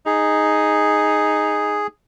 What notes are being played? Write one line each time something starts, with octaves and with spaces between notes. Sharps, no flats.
D#4 G#4